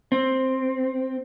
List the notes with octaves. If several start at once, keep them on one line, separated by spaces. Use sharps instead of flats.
C4